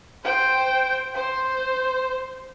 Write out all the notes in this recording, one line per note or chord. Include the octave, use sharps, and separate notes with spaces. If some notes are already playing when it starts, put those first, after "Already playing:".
C5 G5
C5